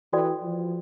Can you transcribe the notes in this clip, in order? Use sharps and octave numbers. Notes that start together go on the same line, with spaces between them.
E3 F#4 A4 D5 G5
F3